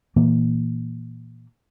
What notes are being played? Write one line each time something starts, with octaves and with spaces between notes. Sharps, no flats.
A#2 E3 A#3